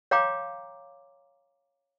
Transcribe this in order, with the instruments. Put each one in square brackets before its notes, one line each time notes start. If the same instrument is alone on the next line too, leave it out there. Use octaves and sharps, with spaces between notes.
[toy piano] C#5 F5 G5 A#5 C6 D6